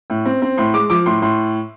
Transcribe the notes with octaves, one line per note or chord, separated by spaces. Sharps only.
A2
C4
C4
A2 C6
G#3 D6
F3 D6
A2 C6
A2 C6